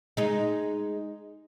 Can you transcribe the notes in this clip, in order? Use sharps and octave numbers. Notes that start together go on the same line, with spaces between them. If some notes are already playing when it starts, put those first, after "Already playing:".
G#3 D#4